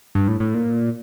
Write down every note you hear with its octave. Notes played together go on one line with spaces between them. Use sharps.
G2
A2
A2
A#2